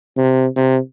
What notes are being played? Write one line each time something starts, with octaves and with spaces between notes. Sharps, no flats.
C3
C3